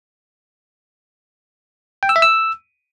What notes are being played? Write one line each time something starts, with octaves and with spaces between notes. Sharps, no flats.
G5
E6
E5
E6